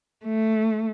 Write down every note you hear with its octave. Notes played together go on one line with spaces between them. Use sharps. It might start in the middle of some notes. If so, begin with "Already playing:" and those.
A3